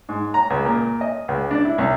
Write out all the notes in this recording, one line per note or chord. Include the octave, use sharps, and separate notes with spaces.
G#2
A#5
C#2
A#2
D#5
C#2
D4
E4
C2